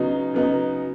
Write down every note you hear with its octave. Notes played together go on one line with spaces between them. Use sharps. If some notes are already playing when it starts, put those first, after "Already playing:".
Already playing: C#3 F#3 B3 D#4
C#3 F#3 B3 D#4